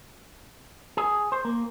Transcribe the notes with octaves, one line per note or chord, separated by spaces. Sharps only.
G#4
C5
A#3